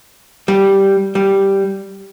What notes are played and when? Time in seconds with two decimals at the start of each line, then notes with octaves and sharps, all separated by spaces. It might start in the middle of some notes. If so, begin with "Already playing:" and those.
0.48 G3
1.15 G3